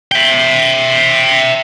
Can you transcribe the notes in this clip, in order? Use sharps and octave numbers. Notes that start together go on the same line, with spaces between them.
E5 G5